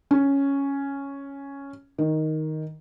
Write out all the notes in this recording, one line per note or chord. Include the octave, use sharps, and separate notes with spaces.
C#4
D#3